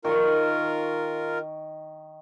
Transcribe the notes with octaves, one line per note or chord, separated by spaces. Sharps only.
D#3 F4 A#4 C#6